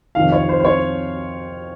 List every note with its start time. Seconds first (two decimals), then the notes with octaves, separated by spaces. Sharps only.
0.15 F2 C3 D#3 F5
0.32 C#5
0.49 C5
0.60 C5
0.65 C#5